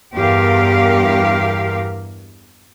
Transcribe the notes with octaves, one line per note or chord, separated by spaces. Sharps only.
E2 G2 G4 A#4 F5